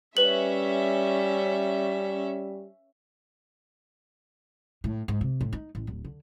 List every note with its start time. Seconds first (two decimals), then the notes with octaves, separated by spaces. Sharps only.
0.17 G3 C#4 B4 E5 F#7
4.84 A2
5.08 G#2
5.21 C3
5.41 A2
5.53 D#4
5.75 A1
5.87 D1
6.05 D3